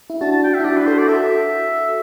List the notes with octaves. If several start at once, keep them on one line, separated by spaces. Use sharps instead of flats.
E4
D4 F#4 A5
A5
G5
E5
E4
D4 F#4 D5
B4
F#4 A4 C5
D5
F#4 A4 E5